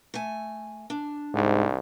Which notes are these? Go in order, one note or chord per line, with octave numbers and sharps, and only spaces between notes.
A3 G#5
D4
C2 G#2